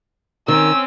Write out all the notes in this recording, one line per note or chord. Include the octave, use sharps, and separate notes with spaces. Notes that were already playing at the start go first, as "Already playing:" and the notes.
D#3 C4 C#4 E6